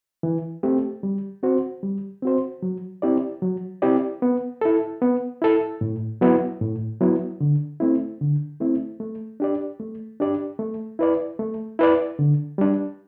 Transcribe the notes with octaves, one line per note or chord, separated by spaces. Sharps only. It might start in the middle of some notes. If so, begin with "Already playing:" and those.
E3
A3 C4 G4
G3
C4 F#4 C5
G3
C4 F#4 C5
F#3
C4 E4 G4 D5
F#3
C4 E4 G4 D5
B3
E4 A4
B3
E4 A4
A2
F#3 B3 E4
A2
F#3 B3 E4
D3
A3 C4 E4
D3
A3 C4 E4
A3
D4 G4 D5
A3
D4 G4 D5
A3
E4 B4 D5
A3
E4 B4 D5
D3
G3 D4